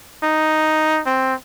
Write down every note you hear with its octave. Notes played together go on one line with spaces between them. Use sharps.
D#4
C4